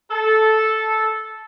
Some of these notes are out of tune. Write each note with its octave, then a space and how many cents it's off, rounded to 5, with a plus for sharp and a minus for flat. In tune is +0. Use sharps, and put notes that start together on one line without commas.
A4 -10